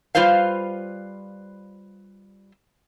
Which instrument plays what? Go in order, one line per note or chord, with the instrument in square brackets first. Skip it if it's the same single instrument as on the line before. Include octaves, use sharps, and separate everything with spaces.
[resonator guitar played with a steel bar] G3 F4 B4 C5 F5